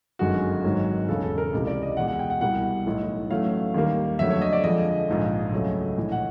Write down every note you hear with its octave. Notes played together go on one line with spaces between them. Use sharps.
G1 F#2 D#3 G#3 F#4
G#1 G#2 D#3 F#3
E1 E2 C#3 A4
A4
A#4
C#2 C3 E3
D5
D#5
E2 B2 G#3 F#5
F#5
G5
F#5
C2 B2 G3 F#5
B1 A2 E3 A3
A1 A2 F#3 A3 F5
D#2 D#3 G3 A#3
F2 D3 F#3 A3 E5
C#5
D#5
D5
F2 D3 F3 G#3 D#5
A#1 G#2 F3
C#2 C#3 F#3 A3
A#1 A2 E3
F#5